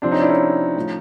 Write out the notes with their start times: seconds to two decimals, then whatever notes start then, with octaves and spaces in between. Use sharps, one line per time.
0.02 C3 F3 C4 D4
0.11 C#4 D#4
0.21 D4 E4
0.30 C#4 D#4
0.76 A2 F3